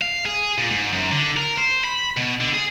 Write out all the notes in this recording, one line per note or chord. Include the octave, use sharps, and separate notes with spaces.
F5
G#4
A#2
G#2
F#2
D3
A#4
C5
B5
B2
D3
G#4